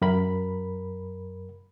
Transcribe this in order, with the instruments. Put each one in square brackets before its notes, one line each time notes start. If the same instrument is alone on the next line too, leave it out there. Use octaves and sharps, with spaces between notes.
[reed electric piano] F#2 A#4 B5